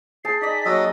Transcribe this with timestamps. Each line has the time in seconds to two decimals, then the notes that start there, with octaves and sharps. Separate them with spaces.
0.25 G#4 G5 A5 C7
0.41 D#4 D5 D#5 B6
0.65 F#3 A#3 D#5 E6